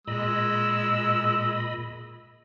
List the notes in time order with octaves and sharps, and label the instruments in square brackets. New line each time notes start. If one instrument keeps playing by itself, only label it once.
[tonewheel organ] A#2 D#5 B5 [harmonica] G#3 E6